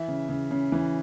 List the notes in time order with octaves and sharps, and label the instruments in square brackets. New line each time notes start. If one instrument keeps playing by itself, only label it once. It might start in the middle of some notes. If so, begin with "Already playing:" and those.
Already playing: [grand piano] E3 E5
C#3
C#3
C#3
E3